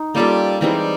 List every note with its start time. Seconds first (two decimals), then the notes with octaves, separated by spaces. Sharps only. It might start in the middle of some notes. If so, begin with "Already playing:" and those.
Already playing: D#4
0.15 G3 A#3 C#4 F4 A4
0.61 E3 G3 G#3 C4 D#4